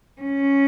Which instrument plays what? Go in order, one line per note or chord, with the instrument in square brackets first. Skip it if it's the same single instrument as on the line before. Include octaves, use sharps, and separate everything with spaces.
[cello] C#4